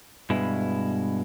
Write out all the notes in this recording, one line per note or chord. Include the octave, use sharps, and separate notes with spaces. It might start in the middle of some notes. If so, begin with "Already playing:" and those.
G2 B2 G#3 E4